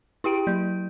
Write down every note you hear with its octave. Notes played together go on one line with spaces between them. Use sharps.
E4 G4 G5 D7
F#3 G6